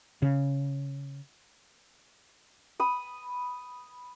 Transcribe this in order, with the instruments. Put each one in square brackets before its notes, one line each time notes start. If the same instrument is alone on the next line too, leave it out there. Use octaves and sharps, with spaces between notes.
[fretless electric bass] C#3
[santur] B5 D#6